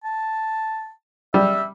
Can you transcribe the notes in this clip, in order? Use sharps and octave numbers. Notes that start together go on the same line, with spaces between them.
A5
G3 E5